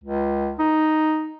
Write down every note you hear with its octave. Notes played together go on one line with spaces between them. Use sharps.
C#2
D#4